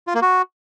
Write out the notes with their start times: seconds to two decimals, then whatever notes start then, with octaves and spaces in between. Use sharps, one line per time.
0.07 F4
0.15 A#3
0.22 F#4